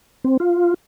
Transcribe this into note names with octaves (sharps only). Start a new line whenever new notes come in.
C4
F4